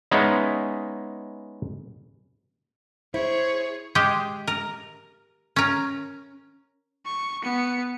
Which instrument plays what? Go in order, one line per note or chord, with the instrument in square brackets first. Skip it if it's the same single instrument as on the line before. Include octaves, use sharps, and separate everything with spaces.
[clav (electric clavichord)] G#3 B3 C#4 D#4 E4
[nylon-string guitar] E4 [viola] G#4 C#5 [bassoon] C5
[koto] G#3 G4
A#4
C#4 A#4
[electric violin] C#6
B3 C#7